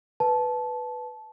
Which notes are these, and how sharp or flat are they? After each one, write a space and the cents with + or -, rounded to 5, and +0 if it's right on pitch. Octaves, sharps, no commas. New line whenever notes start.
B4 +0 A5 -15